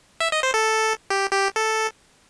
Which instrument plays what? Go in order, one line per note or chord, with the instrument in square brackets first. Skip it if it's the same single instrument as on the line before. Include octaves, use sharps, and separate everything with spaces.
[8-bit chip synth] E5
D#5
C5
A4
G4
G4
A4